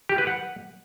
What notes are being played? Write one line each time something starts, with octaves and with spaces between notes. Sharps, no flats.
G4
B4
F#5